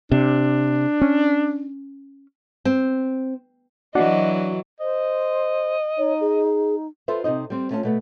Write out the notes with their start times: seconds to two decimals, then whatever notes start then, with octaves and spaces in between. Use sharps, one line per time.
0.12 C3 D4
1.01 C#4
2.65 C4
3.95 E3 F#3 D4 F#4 D5 D#5 F#5
4.80 C5 D#5
5.98 D#4 C#5
6.21 G#4
7.08 F4 A4 B4 C5 E5
7.24 C3 C4 D#4 D#5
7.50 G3 C4
7.71 A3 C#4 F4 D5 A5
7.83 B2 A3 B3